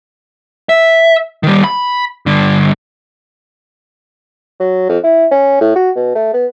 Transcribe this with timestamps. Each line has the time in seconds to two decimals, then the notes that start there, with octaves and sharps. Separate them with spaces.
0.69 E5
1.43 D#3 G3
1.64 B5
2.26 G2 D3
4.60 F#3
4.89 F2
5.04 E4
5.31 C#4
5.61 A2
5.75 F#4
5.95 B2
6.15 A3
6.33 B3